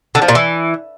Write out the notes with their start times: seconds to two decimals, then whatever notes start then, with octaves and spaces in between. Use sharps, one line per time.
0.15 D3
0.22 F3
0.28 A#2
0.35 E3